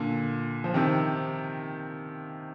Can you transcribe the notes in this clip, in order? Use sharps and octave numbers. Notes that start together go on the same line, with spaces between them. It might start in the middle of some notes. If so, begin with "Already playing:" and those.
Already playing: A#2 D3
F3
C3 D#3